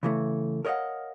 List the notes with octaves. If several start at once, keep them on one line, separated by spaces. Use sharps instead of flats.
C#3 E3 A3
A#4 C#5 D#5 F5 F#5